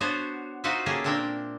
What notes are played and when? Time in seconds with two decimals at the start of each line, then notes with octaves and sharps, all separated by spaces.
0.01 B3 D4 F#4 C5 C#5
0.64 D#4 F4 F#4 B4 C5 E5
0.86 A3 A#3 C#4 G4 G#4
1.04 A#2 C4 D4 A#4 G5